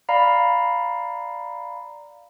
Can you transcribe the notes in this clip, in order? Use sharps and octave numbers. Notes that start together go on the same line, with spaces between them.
D5 F5 A#5 B5